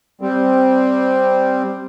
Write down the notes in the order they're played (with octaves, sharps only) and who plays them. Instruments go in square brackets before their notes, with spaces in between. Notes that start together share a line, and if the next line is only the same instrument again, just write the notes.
[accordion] G3 C4